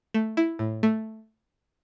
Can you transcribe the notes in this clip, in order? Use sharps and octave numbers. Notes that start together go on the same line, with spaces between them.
A3
E4
A2
A3